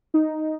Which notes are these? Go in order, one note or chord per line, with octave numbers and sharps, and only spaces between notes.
D#4